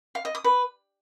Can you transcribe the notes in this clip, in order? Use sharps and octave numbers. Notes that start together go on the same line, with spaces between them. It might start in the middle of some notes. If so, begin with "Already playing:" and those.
F5
D#5
D#6
B4